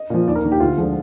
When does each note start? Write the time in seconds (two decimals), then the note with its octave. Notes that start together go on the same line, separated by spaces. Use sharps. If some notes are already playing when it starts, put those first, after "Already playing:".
Already playing: D#5
0.10 A#2 F3
0.27 D#2 D5
0.36 A#4
0.44 D#3 A#3
0.52 G4
0.60 D2 F4
0.78 D3 F3 G#3